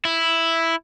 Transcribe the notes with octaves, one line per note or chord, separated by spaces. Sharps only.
E4